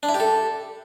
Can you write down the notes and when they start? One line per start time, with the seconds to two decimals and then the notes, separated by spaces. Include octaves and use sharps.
0.03 D4
0.09 E4
0.14 G4
0.20 A4